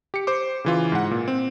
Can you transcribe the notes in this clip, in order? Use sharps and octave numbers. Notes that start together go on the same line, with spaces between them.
G4 C#7
C5 D6
C#3 E3 F4
G#2 F#5
A#2
C4